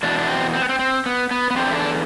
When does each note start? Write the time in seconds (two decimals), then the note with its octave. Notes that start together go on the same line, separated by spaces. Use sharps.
0.03 E2 B2 D4
0.18 D4
0.28 C4
0.53 C4
0.62 B3
0.69 C4
0.79 C4
1.06 B3
1.31 B3
1.50 B3
1.56 E2 D3 F3 C4
1.70 E4
1.76 D4